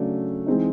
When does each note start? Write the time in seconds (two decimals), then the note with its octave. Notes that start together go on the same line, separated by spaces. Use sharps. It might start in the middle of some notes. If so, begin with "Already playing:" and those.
Already playing: C#3 F#3 A3 D4
0.47 E3 G#3 C4 D#4